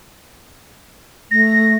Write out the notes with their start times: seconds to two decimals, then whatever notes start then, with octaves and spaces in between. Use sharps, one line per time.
1.31 A3 A#6